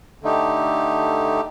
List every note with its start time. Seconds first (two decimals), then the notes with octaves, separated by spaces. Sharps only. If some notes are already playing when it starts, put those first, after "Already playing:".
0.23 D3 A3 D#4 G4